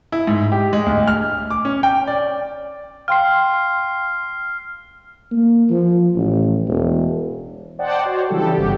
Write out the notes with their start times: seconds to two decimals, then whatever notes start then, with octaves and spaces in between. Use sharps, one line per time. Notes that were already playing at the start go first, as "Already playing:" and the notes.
0.12 E4
0.27 G#2
0.52 G4
0.73 G#3
0.86 D2
1.08 F6
1.50 D6
1.65 C#4
1.83 G5
2.07 D5
3.08 F5 G5 C6 F6 C7
5.31 A#3
5.70 F3
6.15 A1
6.68 E1
7.79 C5 D5 D#5 F#5 G5 A5
8.05 F#4 C5 C#5
8.29 C#3 E3 G3 D4 G4 A4
8.53 G1 C#3 F#4 G4